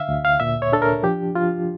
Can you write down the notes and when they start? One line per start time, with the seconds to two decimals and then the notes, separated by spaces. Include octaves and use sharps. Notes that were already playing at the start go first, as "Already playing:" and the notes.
Already playing: D3 E5 F5
0.09 D2
0.25 F5
0.40 A#2 E5
0.62 C#5
0.72 D4 A4
0.82 A#4
1.03 F3 G4
1.35 F3 F4